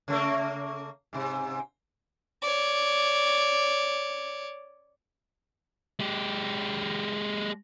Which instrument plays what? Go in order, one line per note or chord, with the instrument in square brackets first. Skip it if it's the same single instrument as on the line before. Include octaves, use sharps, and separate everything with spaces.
[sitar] C#3 A3 A#3
G#2 C3
[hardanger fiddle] C#5 D5
[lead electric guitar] G#3 G4